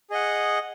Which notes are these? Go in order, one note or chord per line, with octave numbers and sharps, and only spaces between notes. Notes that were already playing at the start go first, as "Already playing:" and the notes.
G#4 D#5 F#5